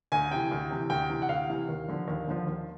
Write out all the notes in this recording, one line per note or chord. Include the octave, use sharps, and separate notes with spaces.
D2 G#5
C3 E3 G5
D2
C3 E3
D2 G5
C3 E3
F#5
D2 F5
C3 E3
D#2
D3 F3
D#2
D3 F3
D#2